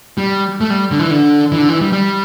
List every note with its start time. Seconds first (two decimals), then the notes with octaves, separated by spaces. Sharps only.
0.18 G3
0.61 A3
0.70 G3
0.91 D3
0.99 E3
1.11 D3
1.52 E3
1.58 D3
1.69 E3
1.81 G3
1.92 G3